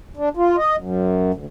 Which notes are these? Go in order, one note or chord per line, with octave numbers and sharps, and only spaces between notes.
D4
F4
D#5
F#2
D2